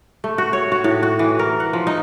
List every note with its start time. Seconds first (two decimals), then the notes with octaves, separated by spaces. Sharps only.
0.24 A3
0.38 F#4
0.53 C#5
0.72 F#4
0.84 A2
1.03 F#4
1.19 E3
1.39 A#4
1.60 F#5
1.73 F3
1.87 D#4